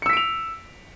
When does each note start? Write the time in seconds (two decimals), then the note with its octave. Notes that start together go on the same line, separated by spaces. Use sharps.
0.02 C#7
0.06 E6
0.10 B6
0.13 D7
0.17 F7